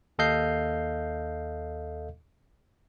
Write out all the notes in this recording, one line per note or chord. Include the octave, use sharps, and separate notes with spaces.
D#2 A4 D#5 F5 G6 C7